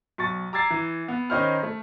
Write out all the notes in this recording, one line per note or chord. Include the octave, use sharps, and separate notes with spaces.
B1 C#6 A6
A#5 D6 E6 G#6 A6 C7
E3
B3
D#3 C#4 D#4 C5 B5 F6
A3